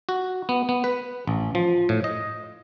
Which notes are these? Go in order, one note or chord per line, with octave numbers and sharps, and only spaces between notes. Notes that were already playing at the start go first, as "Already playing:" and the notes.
F#4
B3
B3
B4
A1
F3
A2
D#5